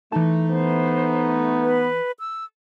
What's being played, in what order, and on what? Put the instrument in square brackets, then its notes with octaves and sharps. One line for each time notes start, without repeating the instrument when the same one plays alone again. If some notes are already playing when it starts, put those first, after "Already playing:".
[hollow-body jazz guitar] E3 A5 [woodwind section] A3 D#4
[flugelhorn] B3 [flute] C5
[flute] B4
E6